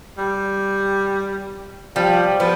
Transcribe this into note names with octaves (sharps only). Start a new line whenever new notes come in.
G3
F3 G3
F3 B3